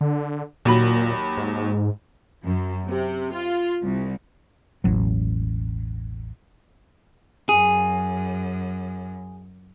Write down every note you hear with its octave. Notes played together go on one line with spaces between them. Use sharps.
D3
D#2 A#2 F#3 B5
G#2
F#2
C3
F4
C2
E1 A1 F#3
F#2 G#4